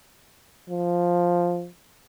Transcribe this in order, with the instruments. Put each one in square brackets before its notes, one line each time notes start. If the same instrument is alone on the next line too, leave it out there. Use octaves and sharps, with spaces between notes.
[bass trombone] F3